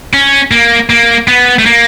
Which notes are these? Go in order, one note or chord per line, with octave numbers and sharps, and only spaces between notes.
C#4
A#3
A#3
B3
A3
A#3